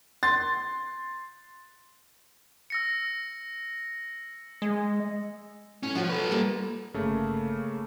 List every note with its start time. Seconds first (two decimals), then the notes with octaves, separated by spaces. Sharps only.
0.23 C6 A6
2.70 E6 A#6 C#7
4.62 G#3
5.83 A2 C#4
5.95 B2 F3 F#4 C#5
6.09 A4 B4
6.31 G3 A#3
6.94 G1 C#3 A3 A#3